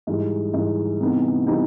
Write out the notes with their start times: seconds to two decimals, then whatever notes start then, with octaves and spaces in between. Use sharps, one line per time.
0.07 G#2 E3 G3
0.54 G#2 E3 G3
1.00 C3 E3 G3 B3 D#4
1.47 C3 E3 G3 B3 D#4